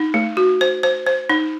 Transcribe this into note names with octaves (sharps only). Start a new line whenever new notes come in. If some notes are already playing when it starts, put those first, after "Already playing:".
Already playing: D#4
A3
F#4
C5
C5
C5
D#4